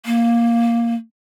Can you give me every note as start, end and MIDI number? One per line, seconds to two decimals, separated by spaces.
0.06 0.94 58